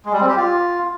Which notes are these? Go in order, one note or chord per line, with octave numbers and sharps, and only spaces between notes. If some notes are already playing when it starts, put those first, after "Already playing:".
G#3
G3
C4
G4
F4